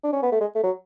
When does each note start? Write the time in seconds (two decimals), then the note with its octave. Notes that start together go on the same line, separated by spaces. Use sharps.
0.04 D4
0.13 C#4
0.23 B3
0.32 A3
0.41 G#3
0.55 A3
0.63 F#3